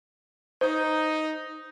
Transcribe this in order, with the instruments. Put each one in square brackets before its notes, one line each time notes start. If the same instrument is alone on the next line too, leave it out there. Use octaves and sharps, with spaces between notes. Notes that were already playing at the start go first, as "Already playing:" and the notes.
[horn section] D#4 [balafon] C5